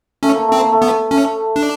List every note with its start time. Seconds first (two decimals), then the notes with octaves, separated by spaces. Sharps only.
0.23 A3 C#4
0.35 A#3
0.48 A3 C4
0.60 A#3
0.72 A3
0.82 B3
1.11 A3 C#4
1.56 D4